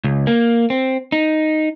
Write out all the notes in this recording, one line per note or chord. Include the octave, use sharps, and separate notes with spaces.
C#2
A#3
C4
D#4